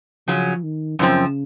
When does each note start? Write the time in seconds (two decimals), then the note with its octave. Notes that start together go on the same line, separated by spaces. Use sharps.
0.28 C#3 F3 F#3 C#4
0.63 D#3
0.99 F#2 C#3 F3 C4